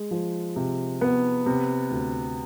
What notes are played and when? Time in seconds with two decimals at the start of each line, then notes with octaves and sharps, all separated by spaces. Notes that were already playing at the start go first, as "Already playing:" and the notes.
Already playing: G#3
0.11 F3
0.56 C3
1.01 B3
1.46 C3
1.91 D2